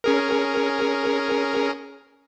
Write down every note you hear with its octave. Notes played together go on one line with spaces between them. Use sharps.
C#4 G#4 A#4